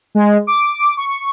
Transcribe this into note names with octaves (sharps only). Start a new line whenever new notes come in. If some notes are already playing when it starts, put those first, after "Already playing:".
G#3
D6
C#6